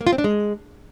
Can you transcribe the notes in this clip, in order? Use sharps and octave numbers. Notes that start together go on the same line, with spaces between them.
A#3
F4
C4
D4
G#3